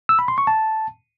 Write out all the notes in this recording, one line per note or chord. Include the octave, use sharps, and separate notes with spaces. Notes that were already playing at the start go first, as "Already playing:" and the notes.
E6
B5
C6
C#6
A5